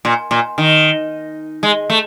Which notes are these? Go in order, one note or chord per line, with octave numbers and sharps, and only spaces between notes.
A#2
A#2
D#3
G#3
A3